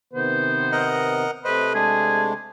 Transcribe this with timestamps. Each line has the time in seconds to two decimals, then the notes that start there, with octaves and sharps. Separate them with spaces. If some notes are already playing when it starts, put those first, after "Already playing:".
0.13 C3 D#3 B3 C5
0.72 A#4 D#5 F#5
1.45 C3 A3 B4 C5 D#5
1.74 G#3 D4 G#4